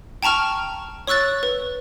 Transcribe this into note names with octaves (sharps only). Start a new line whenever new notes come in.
G5 A5 A#5 C#6 F6
C#5 C#6 E6 F#6 A6
B4